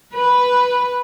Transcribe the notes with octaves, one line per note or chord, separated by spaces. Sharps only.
B4